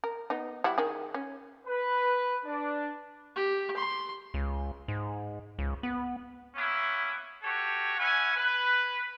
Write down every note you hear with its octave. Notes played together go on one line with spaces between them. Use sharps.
A#4
B3 D#4
G3 E4 F#4
D#3 G#4
C#4
B4
D4
G4
C6
C#2
G#2
C#2
B3
A#3 B3 C#4 E4
F#4 G4 A4 C#5
C#4 E4 F#5 G#5
B4